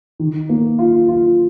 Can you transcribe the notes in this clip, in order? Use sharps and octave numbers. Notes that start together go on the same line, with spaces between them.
D#3
A#3
F4
F4